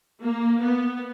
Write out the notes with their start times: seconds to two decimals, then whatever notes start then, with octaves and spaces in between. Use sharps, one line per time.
0.23 A#3
0.63 B3